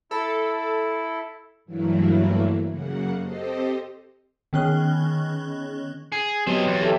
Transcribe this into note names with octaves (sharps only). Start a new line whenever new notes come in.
E4 A4
G2 E3 F#3 A3 A#3 E4
F#2 C#3 A#3 F#5
C4 G4 A4 C5 D#5
D#3 B3 C#4 G#4 F#6 G7
G#4
F#3 B3 C4 G4 D#5
E2
G4 A4 E5